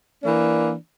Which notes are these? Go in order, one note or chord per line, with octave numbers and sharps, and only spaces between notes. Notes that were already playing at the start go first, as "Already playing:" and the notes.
E3 A#3 D4